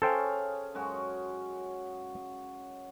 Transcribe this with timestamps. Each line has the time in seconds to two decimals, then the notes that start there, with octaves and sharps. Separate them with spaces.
0.02 C#4 G#4 A4 C5 F5 G5
0.74 F#2 G#3 F#4